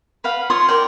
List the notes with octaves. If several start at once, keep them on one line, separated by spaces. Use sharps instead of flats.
B4 F5 F#5
F4 C#5 C6 D#6
A#4 D5 G5